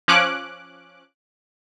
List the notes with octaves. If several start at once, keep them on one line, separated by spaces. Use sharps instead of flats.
F3 C#4 D6 F#6 D7